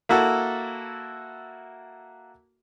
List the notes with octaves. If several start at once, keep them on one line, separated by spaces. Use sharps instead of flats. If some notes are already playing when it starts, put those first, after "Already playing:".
A#3 E4 F#4 A4